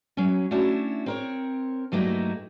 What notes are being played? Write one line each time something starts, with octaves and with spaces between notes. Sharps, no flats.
F#3 C#4
A3 C#4 D4 E4 F#4 C#5
C4 A#4 C#5
G2 F#3 A3 A#3 D#4 E4